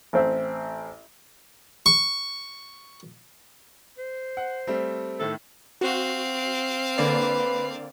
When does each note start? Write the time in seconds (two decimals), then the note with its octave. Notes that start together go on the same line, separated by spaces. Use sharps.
0.13 A1 C4 E5
1.86 C#6
3.98 C5
4.37 F#5
4.67 G3 A3 C4
5.19 A2 D#3 A3 A4
5.81 C4 F#4 F5
6.98 D3 A#3 B4 D5